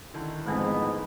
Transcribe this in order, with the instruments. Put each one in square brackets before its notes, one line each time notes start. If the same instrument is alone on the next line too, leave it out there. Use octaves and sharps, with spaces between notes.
[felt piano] D3 D#3 E4
[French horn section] F2 G#2 [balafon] G#3 A3 C4 [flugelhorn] B3